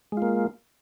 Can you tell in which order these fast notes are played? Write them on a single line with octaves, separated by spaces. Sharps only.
G#3 F4 A#3